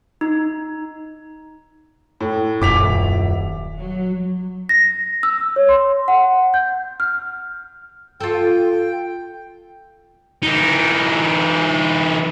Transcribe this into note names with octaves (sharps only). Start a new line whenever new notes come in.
D#4
A2
D#1 F#2 D6 B6 F7
F#3
A#6
E6
C#5
C6
F#5
G6
F6
F4 A4 G5
E3 D#4